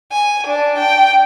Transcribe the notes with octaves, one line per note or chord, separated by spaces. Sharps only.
G#5
D4
G5